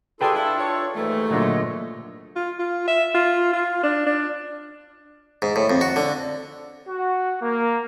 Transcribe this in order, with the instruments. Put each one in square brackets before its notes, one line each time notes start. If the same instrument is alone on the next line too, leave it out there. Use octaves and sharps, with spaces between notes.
[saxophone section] G3 G#4 [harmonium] D4 F4 A4 [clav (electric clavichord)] B4 G5 A5
[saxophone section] E4
C#5
[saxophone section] D#2 G#2 A3 [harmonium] E3
[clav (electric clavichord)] A#2 D3 F#3 [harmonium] C#5 D#5
[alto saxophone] F4
F4
E5
F4
F4
D4
D4
[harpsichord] G#2
A2
F2
F#4
D3
[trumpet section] F#4
A#3